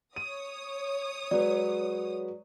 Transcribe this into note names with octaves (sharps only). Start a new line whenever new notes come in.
C#5 D#6 D#7
F#3 G#3 B4 D5